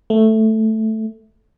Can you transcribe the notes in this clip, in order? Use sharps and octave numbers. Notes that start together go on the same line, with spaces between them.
A3